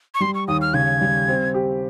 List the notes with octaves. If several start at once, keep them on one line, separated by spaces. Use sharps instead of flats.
C#6
G3 C6
C#6
D#2 D#6
F6
C#3 G#6
G3
C4
G4